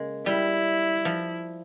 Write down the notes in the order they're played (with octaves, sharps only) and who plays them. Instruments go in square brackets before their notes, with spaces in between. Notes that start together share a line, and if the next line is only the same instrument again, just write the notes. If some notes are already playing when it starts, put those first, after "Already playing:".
Already playing: [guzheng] C#3 G#3 A#3
[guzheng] G3 [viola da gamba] E4
[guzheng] F3